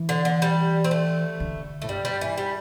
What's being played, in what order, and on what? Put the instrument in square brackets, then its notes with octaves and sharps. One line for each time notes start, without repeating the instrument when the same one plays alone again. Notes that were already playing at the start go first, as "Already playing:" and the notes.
Already playing: [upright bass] E3
[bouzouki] D3
D3
G3
C4
A3
[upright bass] D3
[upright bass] A2 [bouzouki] A3
[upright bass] G2 [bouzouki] G3
[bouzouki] G3
E3
G3